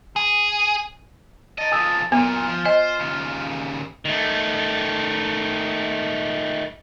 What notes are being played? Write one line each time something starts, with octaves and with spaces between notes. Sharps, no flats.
G#4
A#4 D#5 A5
B1 F3 G#5 D#6 E6
F#2 A#2 B3 F4 G#5
F3
C5 D#5 G#5
D#2 C#3
D#3 A3